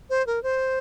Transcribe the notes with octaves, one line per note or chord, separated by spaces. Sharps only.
C5
A#4
C5